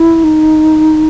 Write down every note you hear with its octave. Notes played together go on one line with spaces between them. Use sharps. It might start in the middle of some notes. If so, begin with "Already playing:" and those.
Already playing: E4
D#4